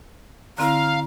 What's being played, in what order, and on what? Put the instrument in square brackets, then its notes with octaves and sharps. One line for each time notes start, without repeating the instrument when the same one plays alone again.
[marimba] D3 C4 E4 [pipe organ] F5 [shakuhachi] A#5